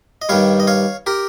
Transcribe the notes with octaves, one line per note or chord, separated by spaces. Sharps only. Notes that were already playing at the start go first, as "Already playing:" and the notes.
D#5
G2 D#3 G3 C#5 F5
D#5
C#5 F5
G4 A#4